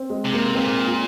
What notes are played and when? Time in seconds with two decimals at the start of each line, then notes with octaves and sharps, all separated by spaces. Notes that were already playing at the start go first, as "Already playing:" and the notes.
Already playing: C4
0.10 G#3
0.25 C3
0.33 A#3
0.55 A#2 C4
0.86 F4